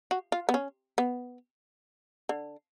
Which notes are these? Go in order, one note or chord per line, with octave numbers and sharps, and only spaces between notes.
F#4
F4
B3
C#4
B3
D3